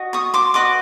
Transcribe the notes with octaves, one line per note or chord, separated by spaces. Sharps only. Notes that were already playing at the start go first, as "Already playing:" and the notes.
Already playing: F#4 D#5
C#6 D#6
C6 D6
F#4 B4 D#5 C6 D6